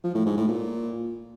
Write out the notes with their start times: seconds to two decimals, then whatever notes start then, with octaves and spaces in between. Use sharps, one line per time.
0.04 F3
0.15 A2
0.26 G#2
0.37 A2
0.48 A#2